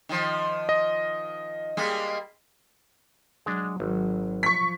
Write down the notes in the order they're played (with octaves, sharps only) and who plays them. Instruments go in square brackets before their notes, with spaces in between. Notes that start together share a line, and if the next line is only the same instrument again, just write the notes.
[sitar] D#3 F3
[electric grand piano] D#5
[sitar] G3 G#3 A#3
[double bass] F#3 [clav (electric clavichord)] G#3 D4
[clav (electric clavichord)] G#1 [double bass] F#3
[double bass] F3 [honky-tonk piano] C#6 B6